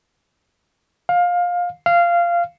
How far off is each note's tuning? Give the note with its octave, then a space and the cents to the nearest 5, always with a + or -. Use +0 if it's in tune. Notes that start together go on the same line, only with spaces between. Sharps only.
F5 +20
F5 -15